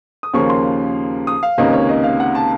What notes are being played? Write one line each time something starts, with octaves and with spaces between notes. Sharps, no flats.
D#6
D#2 C#3 F3 A#3 C#4 C#6
C6
D#6
F5
C#2 C3 D#3 A#3 C#4 D#5
C#5
D#5
F5
F#5
A5